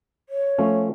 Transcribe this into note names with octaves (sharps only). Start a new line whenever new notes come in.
C#5
F3 A3 C#4